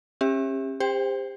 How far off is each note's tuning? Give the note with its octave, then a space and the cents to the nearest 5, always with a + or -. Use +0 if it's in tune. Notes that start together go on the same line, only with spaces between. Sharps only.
C#4 -40 G4 +30 E5 +0
G4 +35 C5 +0 G5 +0